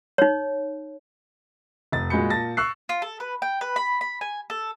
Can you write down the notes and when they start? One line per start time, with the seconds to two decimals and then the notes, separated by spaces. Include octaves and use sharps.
0.18 D#4 C#5
1.92 F1 A6
2.10 A#2 G#3 F#4 B5 G6 C#7
2.30 A#2 A5 A6 A#6
2.57 C#6 E6 F#6 C7
2.89 F4
3.02 A4
3.20 B4
3.42 G5
3.61 B4
3.76 B5
4.01 B5
4.21 G#5
4.50 A4